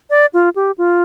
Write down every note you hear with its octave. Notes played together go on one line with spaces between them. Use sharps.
D5
F4
G4
F4